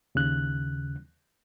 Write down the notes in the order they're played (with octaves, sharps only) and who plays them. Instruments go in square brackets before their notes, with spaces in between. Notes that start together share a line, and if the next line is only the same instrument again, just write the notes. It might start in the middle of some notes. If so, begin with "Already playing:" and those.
[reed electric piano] D#2 C#3 F#6